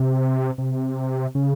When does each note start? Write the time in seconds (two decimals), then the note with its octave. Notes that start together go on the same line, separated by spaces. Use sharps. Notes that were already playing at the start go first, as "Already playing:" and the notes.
Already playing: C3
0.58 C3
1.35 C#3